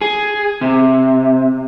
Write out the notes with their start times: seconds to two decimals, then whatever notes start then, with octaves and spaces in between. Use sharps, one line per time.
0.01 G#4
0.61 C3